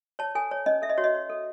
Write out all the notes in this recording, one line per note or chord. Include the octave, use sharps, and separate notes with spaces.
C#5 A5
A4 G#5
C#5
C#4 D#5
A4 E5
D#5
F#4 C#5
D#5
C#5
A4